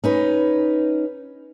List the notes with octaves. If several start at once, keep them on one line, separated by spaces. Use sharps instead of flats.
C#4 D#4 B4